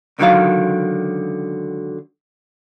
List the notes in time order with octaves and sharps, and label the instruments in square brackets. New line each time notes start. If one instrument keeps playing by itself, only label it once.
[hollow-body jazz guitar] C#2 D3 D#3 F3 F#3 F5